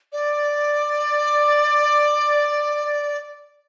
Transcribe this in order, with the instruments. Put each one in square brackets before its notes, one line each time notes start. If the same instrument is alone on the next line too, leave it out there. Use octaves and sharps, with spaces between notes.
[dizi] D5